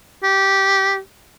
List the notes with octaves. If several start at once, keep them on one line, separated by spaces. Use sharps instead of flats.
G4